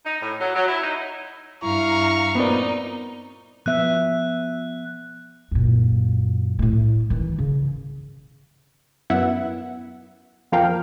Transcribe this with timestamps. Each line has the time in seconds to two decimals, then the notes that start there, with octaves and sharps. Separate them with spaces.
0.04 D#4
0.21 A2
0.40 F#3
0.54 F#3
0.67 E4
0.83 D#4
1.63 G2 E4 F5 A#5 C#6
2.35 A#2 B3 C4 D#4 D5
3.66 F3 B3 E5 F#6
5.51 F#2 A#2
6.59 A2 A3
7.10 D#3 E3
7.39 C#3
9.10 F#2 B3 E4 E5 F#5
10.52 F2 F3 A#3 F5 G5